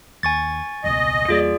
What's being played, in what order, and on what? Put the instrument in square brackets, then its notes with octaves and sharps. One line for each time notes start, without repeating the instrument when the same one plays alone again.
[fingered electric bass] D#2 [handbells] G#5 C#6 A6
[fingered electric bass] E1 C#2 B2 [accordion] D#5
[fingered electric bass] E2 G3 A#3 [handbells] F4 G#4 D5